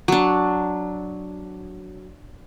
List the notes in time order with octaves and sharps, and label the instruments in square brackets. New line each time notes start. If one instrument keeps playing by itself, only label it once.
[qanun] F#3 D4